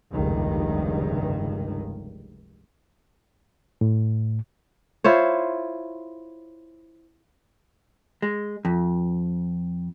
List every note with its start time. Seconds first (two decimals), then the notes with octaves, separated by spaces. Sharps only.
0.12 F1 C#2 G2 D#3
3.81 A2
5.04 E4 F4 C5 C#5
8.22 G#3
8.65 F2